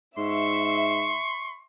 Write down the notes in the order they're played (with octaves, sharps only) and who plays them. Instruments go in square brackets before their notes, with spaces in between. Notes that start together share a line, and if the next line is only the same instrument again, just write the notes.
[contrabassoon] G#2 [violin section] E5 [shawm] C6 [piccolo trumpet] C#6